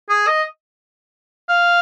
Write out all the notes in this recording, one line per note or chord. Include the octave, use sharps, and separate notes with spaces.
G#4
D#5
F5